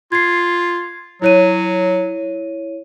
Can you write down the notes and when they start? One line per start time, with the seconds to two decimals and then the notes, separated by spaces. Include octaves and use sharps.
0.12 F4 G#6 C7
1.22 F#3 E4 C#5 D#7